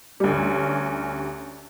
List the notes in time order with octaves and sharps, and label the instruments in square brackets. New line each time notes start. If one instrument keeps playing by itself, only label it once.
[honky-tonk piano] D2 G3 [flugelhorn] C#4